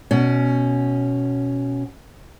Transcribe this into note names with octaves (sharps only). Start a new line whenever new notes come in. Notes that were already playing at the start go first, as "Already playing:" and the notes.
B2 C#4